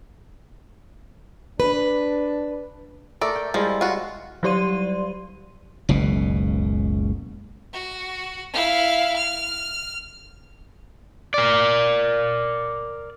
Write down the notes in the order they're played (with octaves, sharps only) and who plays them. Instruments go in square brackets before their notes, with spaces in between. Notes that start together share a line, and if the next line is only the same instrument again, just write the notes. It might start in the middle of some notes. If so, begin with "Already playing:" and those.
[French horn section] D4 [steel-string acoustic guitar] B4
[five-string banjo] A3 D5 [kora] A4 A#4
[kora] G5
[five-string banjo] F3 [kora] G3 G#3 E4
[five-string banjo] F4 F#4
[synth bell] F#3 G3 G4 D5 C6 D#7
[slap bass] F#1 C#2 B2
[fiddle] F#4
E4 F5
F6
[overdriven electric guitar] A#4 D5